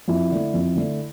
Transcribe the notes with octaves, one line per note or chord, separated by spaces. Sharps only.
F2 E4
D3 A3
F2
D3 A3